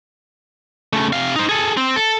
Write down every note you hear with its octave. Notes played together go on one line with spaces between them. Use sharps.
C#3 A3
C3 F5
D#4 C5
G#4 A4
C4
A4